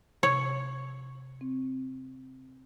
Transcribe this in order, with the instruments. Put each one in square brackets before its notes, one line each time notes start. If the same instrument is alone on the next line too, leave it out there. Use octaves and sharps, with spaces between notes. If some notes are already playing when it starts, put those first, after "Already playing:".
[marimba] C3 [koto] C#5
[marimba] C4